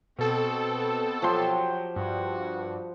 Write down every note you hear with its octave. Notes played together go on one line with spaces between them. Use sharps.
B2 C4 A4
F3 F#3 G4 C6
G2 F#4